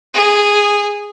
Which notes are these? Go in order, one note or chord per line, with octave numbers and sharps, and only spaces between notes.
G#4